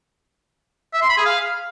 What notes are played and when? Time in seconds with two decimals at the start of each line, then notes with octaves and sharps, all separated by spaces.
0.94 E5
1.02 C6
1.10 B5
1.18 G#4
1.26 F5